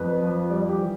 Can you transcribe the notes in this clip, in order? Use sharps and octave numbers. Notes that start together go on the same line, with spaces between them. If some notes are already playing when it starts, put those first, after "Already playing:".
Already playing: F2 B4
F3
G3 D5
G4
E3